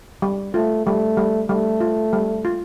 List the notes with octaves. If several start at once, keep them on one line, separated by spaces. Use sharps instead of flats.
G3
A3 F4
G3 A3
G3
G3 A3
F4
G3
F4